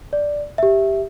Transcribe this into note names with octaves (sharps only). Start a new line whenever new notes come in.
D5
G4 E5